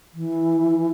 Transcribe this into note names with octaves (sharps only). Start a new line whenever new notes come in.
E3